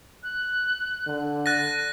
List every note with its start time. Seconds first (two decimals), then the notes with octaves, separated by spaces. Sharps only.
0.23 F#6
1.07 D3
1.46 F#6 A6 A#6 D#7